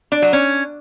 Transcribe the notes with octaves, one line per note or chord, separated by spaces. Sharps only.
D4
F#3
C#4